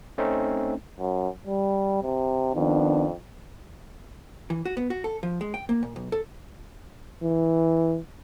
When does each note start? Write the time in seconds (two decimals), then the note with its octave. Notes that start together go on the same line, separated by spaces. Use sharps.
0.18 A3 C4 C#4 D#4
0.99 F#2
1.47 G3
2.03 C3
2.55 F2 D#3 B3 D4
4.50 E3
4.65 F#4
4.77 B3
4.90 F#4
5.04 A4
5.23 F3
5.41 G#3
5.54 G5
5.69 A#3
5.83 A#2
5.96 B1
6.12 A4
7.22 E3